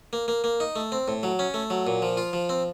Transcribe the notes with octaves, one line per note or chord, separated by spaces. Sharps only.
A#3
A#3
A#3
D#4
A3
C4
A2
F#3
C#4
A3
F#3
A#2
F3
F4
F3
C4